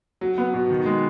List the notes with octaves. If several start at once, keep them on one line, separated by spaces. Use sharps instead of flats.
F#3
B3
B2
D#3
G#3